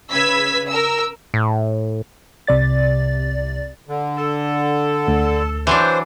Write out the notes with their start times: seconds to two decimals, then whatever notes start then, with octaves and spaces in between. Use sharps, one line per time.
0.11 C#3 B4 E6 G#6 B6
0.68 A#4 E6
1.34 A2
2.47 C2 C3 D5 A6
3.88 D3
4.18 A4
5.08 D2
5.67 E3 F#3 D4 C5